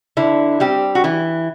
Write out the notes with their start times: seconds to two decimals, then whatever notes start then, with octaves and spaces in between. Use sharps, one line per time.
0.17 D3 E4
0.60 G3 C4 G4
0.95 F#4
1.04 E3 E4